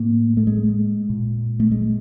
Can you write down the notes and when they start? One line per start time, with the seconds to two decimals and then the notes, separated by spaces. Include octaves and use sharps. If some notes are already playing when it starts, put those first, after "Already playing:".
Already playing: A2 A#3
0.37 A3
0.47 G#3
1.10 A#2
1.60 A3
1.71 G#3